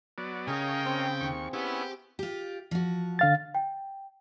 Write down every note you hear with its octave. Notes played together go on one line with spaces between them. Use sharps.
F#3 B3 D5
C#3 G#4 A#4 C#5 D#5 F5 G5
C4
D#2 C#6
B3 C#4 E4 G4
F4 G4
F3 F#4
D3 F5 A6
G5